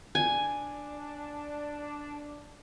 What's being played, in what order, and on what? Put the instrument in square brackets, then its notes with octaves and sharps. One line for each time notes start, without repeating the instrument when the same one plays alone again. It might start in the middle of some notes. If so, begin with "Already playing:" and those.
[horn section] D4 [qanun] G#5